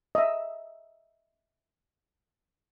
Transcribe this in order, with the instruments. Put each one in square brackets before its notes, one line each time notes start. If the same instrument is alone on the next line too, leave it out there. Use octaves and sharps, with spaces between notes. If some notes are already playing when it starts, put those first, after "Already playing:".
[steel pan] D#5 E5